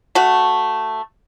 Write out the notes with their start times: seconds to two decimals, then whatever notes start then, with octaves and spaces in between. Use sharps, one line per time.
0.15 A3 F#4